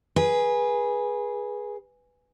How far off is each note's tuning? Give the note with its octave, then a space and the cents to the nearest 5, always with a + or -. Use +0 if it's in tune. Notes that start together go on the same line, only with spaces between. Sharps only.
G#4 +0 B4 -25